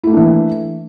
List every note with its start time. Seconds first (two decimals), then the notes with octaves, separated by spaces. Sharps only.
0.04 E4
0.07 A3
0.10 A#3
0.13 D4
0.17 E3